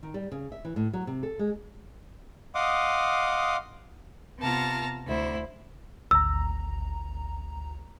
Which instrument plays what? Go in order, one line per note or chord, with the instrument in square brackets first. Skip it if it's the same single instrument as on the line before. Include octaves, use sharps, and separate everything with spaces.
[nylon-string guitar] D#3
G3
C#3
E5
E3
A2
F#3
C3
A4
G#3
[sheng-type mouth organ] D#5 F5 F#5 C6 D6 D#6
[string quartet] C3 B3 F4 A5 A#5 F6
D2 E4 C5
[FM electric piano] G#1 D2 A#5 [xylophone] E6